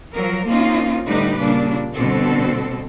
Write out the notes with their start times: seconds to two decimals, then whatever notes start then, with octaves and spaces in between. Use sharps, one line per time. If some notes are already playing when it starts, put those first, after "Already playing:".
0.14 F3 F#3 A#4
0.47 A#3 C4 C#4 D#4 F4
1.07 A2 D3 G3 D#4 G4 B4
1.40 A#2 C#3 G3 D4
1.93 G2 B2 D3 C4 A4